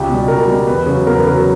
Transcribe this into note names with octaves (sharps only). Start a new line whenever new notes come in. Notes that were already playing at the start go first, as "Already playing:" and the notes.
Already playing: C#2 G4
B2
G3
C#2 A#4
B2 G3
E2 B4
C#3 F#3
E2 A#4
B4
C#3 F#3 A#4